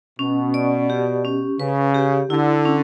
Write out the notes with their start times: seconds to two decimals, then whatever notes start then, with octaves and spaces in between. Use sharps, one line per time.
0.19 B2 C#4
0.54 D5
0.90 G4
1.25 C#4
1.60 C#3 B4
1.94 G4
2.30 D3 E4
2.65 C#4